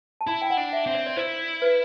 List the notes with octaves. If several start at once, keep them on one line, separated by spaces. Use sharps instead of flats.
A5
E4 B5
G5
F#5
D4
E5
C4 E5
D5
D5
E4 C5
B4